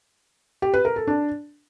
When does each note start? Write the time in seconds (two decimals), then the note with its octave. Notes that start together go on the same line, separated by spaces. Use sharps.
0.62 G4
0.74 B4
0.85 A#4
0.96 A4
1.07 D4